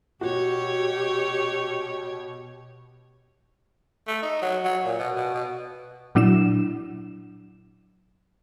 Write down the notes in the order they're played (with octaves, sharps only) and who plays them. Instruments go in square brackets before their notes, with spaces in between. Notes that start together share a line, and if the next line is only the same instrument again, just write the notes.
[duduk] B2 [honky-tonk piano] F#4 [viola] G4 C#5
[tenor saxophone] A3
D#4
F#3
F#3
A#2
B2
B2
B2
[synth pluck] A#2 F#3 D4 E4 E7